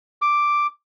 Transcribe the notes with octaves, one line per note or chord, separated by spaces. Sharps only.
D6